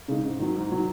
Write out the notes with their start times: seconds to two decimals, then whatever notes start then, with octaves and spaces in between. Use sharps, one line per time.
0.08 C#3 G#3 D#4
0.23 G#2
0.39 D#3 F#3
0.56 G#2
0.71 D#3 F#3